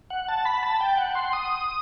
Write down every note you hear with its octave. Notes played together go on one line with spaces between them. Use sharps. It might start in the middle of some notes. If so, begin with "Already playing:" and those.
F#5
A5
B5
A5
G5
F#5
C6
D#6